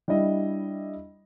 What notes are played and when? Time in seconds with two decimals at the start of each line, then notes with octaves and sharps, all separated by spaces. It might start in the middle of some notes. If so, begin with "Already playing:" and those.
0.08 G3 D4 E4 D#5